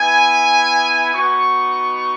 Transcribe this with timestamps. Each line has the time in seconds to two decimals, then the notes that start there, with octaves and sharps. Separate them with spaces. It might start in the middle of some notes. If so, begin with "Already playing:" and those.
Already playing: B3 E4 G#5
1.13 B3 D#4 F#4 C#6